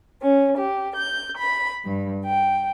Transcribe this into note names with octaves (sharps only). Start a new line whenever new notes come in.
C#4
G4
G6
B5
G2
G5